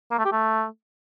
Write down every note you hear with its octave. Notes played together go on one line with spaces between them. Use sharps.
A#3
A3
G4
A3